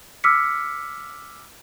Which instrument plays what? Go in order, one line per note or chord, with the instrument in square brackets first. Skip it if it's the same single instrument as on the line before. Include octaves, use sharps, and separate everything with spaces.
[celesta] D6 E6 F6 B6 C#7